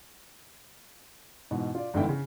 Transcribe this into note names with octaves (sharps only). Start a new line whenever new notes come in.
G#2 B2 E3
F4 D5
G1 G#2 D3 E3 E4 G5
C#3